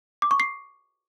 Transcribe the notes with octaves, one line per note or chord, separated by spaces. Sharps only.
D6
C#6
C7